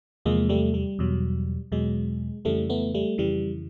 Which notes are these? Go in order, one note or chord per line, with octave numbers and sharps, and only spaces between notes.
E2 C3 F3 G#3 A#3
G3 A3
G3
E2 B2 F#3
E2 B2 F#3 G#3
F2 C#3 E3 G3 A3
A3 B3
G3 A3
F2 C#3 E3 G3